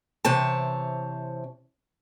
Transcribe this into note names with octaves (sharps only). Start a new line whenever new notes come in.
C3 E3 C4 C#5 A5